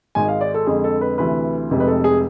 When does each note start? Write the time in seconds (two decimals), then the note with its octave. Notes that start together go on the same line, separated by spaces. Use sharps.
0.15 G#1 G#2 G#3 G#5
0.28 F5
0.41 D5
0.54 A4
0.67 F2 D3 G#3 G#4
0.84 A4
1.01 B4
1.18 D2 C3 E3 B4
1.70 F1 F2 C3 G#3
1.80 B4
1.87 A4
2.04 G#4